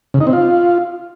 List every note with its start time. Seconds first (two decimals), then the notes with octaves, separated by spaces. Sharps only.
0.14 C#3
0.20 D#4
0.27 C4
0.33 F4